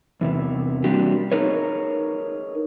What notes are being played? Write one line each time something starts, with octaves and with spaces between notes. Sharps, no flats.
E2 C3 E3
G3 A#3 C4 D4 F#4 G4
D#4 G#4 A#4 B4 C#5